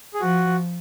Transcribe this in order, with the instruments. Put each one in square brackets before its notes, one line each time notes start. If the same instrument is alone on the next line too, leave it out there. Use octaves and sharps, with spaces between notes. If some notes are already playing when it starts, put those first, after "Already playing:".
[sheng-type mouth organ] G#4
[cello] F3 [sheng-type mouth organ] F#4